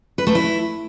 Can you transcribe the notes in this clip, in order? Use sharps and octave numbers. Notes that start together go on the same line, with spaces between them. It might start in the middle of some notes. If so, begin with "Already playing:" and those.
B4
A3
E4